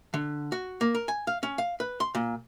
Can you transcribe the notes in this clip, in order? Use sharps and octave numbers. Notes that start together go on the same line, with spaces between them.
D3
F#4
A#3
A#4
G#5
F5
C#4
F5
B4
C6
A#2